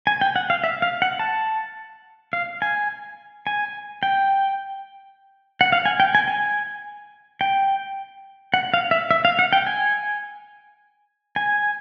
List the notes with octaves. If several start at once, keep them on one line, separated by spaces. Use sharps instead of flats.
G#5
G5
F#5
F5
E5
F5
F#5
A5
F5
G#5
G#5
G5
F#5
F5
G#5
G5
G#5
G#5
G5
F#5
F5
E5
E5
F5
F#5
G5
G#5
G#5